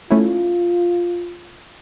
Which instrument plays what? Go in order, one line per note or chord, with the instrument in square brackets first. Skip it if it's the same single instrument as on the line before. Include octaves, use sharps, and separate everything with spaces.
[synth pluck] A3 C#4 E4 [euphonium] F4